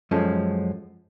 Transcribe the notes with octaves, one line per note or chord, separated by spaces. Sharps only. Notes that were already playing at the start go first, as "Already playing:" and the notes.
F#2 F3 G#3 C#4 A4